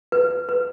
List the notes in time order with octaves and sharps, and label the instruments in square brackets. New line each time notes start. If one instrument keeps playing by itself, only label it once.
[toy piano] B4
B4